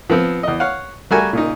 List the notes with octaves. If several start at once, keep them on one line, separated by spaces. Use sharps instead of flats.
F3 B3 C4
E2 D#5
C#5 F5 F#5
G3 A3 F#4 A#4 G#5
A#2 C#3 D#4